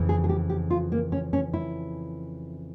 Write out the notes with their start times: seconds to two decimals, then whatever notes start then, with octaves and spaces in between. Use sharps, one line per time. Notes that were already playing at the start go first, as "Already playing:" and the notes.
Already playing: F2 C#3 E3
0.09 G#4
0.24 G#4
0.29 G4
0.50 G4
0.70 F4
0.92 A#3
1.12 C#4
1.33 C#4
1.54 E4